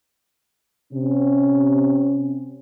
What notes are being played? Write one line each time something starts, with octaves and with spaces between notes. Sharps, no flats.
C3 C#4